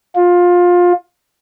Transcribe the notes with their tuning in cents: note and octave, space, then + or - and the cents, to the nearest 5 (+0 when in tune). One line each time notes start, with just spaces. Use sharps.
F4 +20